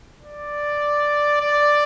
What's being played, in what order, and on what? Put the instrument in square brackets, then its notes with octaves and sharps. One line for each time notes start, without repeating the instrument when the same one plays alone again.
[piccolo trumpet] D5
D5